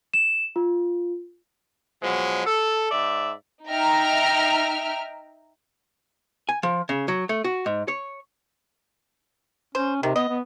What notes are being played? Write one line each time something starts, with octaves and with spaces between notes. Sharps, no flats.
E7
F4
B2 F3 F#3 G#3
A4
G#2 D5 E5
D#4 E5 G5 A#5 F6
G#5
F3
C#3
F#3
A3
F#4
G#2
C#5
C#4 C5
C3 D#3
B3 D#5
B3